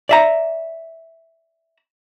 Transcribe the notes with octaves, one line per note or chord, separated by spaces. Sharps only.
D5 E5 A#5